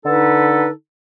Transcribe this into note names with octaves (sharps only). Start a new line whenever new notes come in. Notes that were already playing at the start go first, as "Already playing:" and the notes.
D3 D#4 A4 B4